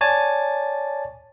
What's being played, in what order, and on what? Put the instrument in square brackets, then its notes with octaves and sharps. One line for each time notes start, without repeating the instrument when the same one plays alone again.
[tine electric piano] C#5 D5 G#5 A5 A6